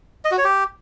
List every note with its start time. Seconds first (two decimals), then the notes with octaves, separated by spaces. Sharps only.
0.25 D#5
0.31 F#4
0.38 C#5
0.44 G4